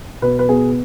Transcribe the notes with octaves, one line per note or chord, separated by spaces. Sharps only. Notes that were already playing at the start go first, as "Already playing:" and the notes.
B2 B4
B4
B3 G#4